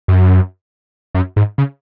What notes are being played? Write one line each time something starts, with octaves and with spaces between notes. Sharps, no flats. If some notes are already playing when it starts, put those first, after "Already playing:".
F#2
F#2
G#2
C#3